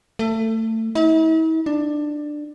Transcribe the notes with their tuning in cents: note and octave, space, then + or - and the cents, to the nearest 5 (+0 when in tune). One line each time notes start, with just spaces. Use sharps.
A3 +25
E4 -45
D4 +15